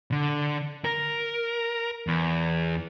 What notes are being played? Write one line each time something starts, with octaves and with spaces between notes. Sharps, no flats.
D3
A#4
E2